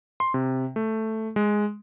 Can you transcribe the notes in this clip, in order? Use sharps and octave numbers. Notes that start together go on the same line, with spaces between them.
C6
C3
A3
G#3